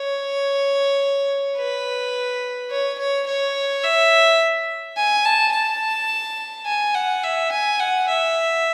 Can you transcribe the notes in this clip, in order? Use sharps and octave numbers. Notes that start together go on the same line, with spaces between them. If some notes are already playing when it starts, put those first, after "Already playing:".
Already playing: C#5
B4
C#5
C#5
C#5
E5
G#5
A5
A5
G#5
F#5
E5
G#5
F#5
E5